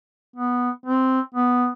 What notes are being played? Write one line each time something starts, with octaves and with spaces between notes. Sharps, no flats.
B3
C4
B3